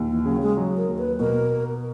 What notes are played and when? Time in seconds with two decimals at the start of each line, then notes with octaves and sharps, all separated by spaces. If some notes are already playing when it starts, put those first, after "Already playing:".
Already playing: D#2 A#2
0.09 E3
0.25 C#3 F#3
0.42 G#3
0.57 F#3
0.77 A#4
0.88 D#2
0.99 B4
1.19 B2 A#4